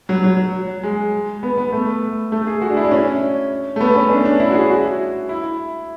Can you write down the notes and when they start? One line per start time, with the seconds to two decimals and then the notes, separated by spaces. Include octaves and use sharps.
0.09 F#3
0.24 F#3
0.83 G#3
1.43 B3
1.57 B3
1.72 A3
2.32 A3
2.47 G#4
2.61 F#4
2.70 D4
2.77 E4
2.85 D4
2.91 C#4
3.76 A3
3.81 B3
3.95 C#4
4.10 D4
4.17 C#4
4.25 D4
4.40 E4
4.50 F#4
4.54 G#4
4.70 F#4
5.29 E4